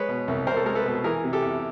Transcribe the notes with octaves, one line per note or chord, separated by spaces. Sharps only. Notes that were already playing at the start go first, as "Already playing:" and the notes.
Already playing: G#3 B4 C#5
B2
C2
C2 A#4 C5
A4
G#3 A#4
A4 B4
B2
E3 G#4 A#4
C3
G4 A4
E2